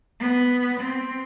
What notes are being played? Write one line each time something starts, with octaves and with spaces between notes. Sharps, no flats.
B3
C4